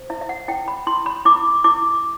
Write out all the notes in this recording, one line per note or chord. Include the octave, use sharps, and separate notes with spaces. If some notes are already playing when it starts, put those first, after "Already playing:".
Already playing: C5
E4 E5
E5
F#5
E4 G5
B5
E4 C6
B5
E4 D6
E4 D6